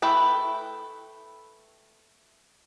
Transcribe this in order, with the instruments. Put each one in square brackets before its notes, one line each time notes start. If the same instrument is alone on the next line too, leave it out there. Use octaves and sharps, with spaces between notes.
[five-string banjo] A3 E4 B4 G5